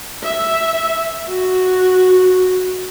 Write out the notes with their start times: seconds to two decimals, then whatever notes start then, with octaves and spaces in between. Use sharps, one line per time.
0.23 E5
1.29 F#4